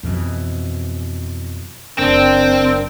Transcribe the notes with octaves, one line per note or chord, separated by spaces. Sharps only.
F2 B2 E3
F#1 C4 D4 A#4 C5